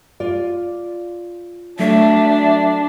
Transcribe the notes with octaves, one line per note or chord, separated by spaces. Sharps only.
F4 D5
F#3 A3 D4 E5